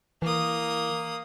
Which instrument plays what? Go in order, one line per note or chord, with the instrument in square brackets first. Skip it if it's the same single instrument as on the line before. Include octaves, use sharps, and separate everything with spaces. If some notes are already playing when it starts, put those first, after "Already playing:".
[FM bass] E3 [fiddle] A#3 D#6